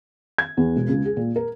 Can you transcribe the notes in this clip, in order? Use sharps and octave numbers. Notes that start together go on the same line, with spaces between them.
G#6
E2
E1
C#2
G#4
A#2
A#4